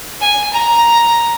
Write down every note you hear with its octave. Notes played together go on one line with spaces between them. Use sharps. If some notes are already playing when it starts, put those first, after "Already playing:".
G#5
A#5